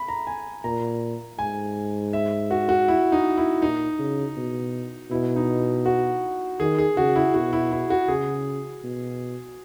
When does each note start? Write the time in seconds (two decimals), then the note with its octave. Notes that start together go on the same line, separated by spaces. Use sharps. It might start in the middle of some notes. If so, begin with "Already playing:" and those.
Already playing: B5
0.08 A#5
0.27 G#5
0.64 A#2 A#5
1.39 G#2 G#5
2.13 E5
2.51 F#4
2.69 F#4
2.88 E4
3.12 D#4
3.37 E4
3.61 A#2 D#4
3.99 C#3
4.37 B2
5.11 B2 E4
5.36 D#4
5.86 F#4
6.60 D#3 G#4
6.78 G#4
6.97 C#3 F#4
7.16 E4
7.34 B2 F#4
7.53 E4
7.71 E4
7.90 F#4
8.08 C#3 G#4
8.84 B2